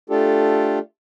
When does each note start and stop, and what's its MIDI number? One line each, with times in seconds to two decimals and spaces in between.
0.10 0.79 57
0.10 0.79 62
0.10 0.79 65
0.10 0.79 67
0.10 0.79 69